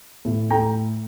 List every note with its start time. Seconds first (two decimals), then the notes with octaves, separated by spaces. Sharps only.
0.25 A2
0.50 A3 G5 A#5